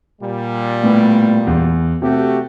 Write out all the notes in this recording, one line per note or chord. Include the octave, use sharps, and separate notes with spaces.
A#2 G3
A2 B3
E2
C3 A3 F#4 G4